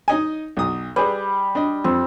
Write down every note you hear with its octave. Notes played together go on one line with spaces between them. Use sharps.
D#4 D#5 G#5
B1 D#6
G3 G#4 B4
D4 D#5
F2 C4